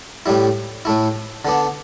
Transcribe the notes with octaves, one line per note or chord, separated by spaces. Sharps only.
A2 G3 E4
A2 A3 E4
D3 B3 D4